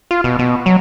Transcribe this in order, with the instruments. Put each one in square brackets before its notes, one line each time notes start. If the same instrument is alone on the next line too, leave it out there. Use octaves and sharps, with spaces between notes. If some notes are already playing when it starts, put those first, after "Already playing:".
[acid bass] F4
B2
B2
F#3